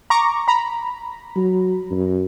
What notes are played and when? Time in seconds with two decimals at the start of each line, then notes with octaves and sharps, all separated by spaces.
0.10 A#5 C#6 D6
0.48 A#5 B5
1.36 F#3
1.91 F#2